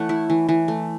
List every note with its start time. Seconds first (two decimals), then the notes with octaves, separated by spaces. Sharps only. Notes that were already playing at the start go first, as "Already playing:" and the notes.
Already playing: E3 A3 C#5 F#5
0.09 E4
0.30 E3
0.49 E3
0.68 A3